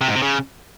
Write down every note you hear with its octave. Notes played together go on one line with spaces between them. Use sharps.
C3
G#2
C3
C#3